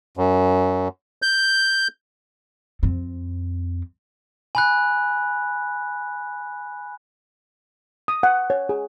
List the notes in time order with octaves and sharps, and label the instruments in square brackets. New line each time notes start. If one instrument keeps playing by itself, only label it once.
[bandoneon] F#2
G6
[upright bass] F2 C4
[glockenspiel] G#5 B5 F#6
[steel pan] D#6
F#5
C#5
G#4